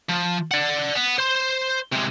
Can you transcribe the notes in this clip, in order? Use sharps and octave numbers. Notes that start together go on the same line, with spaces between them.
F3
D5 F#5
B3
C5 C6
C3 G#3